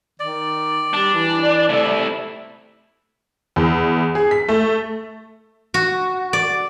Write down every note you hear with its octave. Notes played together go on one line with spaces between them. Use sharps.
D#3 D5
G3 D4
E3
D5
C3 A3 E4
E2
G#4
B6
A3
F#4
D5